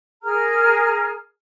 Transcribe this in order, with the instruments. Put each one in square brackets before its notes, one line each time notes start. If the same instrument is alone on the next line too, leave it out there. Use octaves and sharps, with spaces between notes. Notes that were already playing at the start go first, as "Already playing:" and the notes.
[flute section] G#4 A#4 A#5 F6